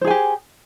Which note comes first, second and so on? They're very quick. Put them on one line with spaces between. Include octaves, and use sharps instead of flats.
C5 G#4 G#5 G4